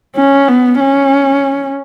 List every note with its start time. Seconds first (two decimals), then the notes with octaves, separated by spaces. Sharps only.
0.16 C#4
0.48 B3
0.80 C#4